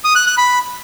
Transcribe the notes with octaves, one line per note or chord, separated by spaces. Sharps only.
D#6
F#6
F#6
B5